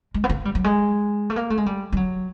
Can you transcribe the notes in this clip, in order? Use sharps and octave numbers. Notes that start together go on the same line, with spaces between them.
G#3
B3
A#3
G3
F#3
G#3
A3
A#3
A3
G#3
G3
G3
F#3